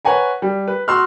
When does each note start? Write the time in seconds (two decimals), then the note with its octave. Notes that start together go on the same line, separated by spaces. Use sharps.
0.05 B4 C#5 F#5 G#5 A#5
0.42 G3
0.68 B4
0.88 F#4 C6 E6 F6